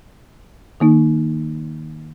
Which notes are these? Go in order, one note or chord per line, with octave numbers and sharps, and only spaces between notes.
D#3 A#3 D#4